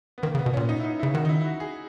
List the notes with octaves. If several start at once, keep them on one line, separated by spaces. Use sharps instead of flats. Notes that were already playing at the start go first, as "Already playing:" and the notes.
B3
D#3 A#3
C#3
B3
B2
C#4
A#2
D#4
E4
D#4
E4
C#3
D#3 F#4
D#4
E4
E4
F#4
G#4